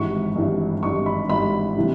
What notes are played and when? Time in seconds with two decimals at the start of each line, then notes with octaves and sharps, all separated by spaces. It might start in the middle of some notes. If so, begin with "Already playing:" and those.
Already playing: G#1 G2 E3 C#6
0.36 G#1 G2 E3
0.83 G#1 G2 E3 C#6
1.06 B5
1.29 G#1 G2 E3 B5
1.77 C3 E3 G3